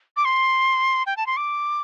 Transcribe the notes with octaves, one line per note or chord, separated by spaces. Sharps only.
D6
C6
G5
A5
C6
D6